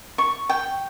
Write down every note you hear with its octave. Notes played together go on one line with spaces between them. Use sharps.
C#6
G5